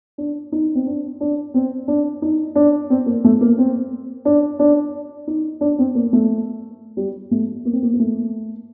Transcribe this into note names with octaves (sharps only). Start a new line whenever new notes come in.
D4
D#4
C4
D4
D4
C4
D4
D#4
D4
C4
A#3
A3
A#3
C4
D4
D4
D#4
D4
C4
A#3
A3
G3
A3
A#3
C4
A#3
A#3
A3